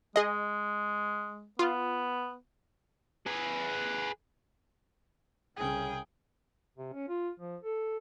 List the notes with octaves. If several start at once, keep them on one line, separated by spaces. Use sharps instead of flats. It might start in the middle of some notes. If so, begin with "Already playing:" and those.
G#3 G#4 D#5
B3 F4
G#4 B4
C2 C#3 G#4 G5
C3
C#4
F4
F3
A4